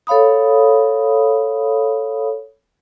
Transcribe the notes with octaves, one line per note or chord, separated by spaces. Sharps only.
A4 C#5 F5 B5 D#6